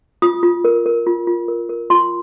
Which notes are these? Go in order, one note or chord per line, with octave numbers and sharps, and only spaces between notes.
F4 D#6
F4
A#4
A#4
F4
F4
A#4
A#4
F4 C6